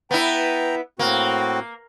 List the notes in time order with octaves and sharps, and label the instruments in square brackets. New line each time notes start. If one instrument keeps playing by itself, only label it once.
[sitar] B3 E4 [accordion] G5 A#5
[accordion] A2 C4 F#4 [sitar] A#3